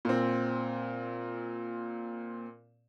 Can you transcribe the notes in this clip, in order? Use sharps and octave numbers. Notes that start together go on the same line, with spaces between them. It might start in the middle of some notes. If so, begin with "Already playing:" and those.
A#2 C4